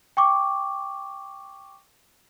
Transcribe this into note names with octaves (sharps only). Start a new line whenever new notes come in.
G5 C#6 D6